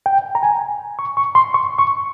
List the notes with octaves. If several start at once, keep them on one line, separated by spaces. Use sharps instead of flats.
G5
A#5
G#5
C#6
C#6
C6
C#6
C#6